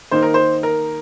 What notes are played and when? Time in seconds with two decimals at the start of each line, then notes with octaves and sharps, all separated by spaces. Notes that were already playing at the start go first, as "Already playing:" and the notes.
0.11 D#3 A#3 D#4 C5
0.22 A#4
0.34 C5
0.63 A#4